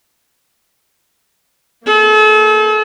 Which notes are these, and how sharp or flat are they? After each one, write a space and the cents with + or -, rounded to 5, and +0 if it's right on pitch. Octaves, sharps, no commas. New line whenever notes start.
A#3 -15 A4 -40